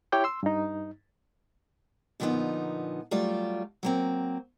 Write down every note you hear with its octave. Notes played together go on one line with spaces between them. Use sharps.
E4 G4 C#5 G5 D6
C6 E6
G2 D#4
A#2 D3 F3 A3 B3 D#4
F#3 G3 A3 F4 D5
F#3 A#3 C4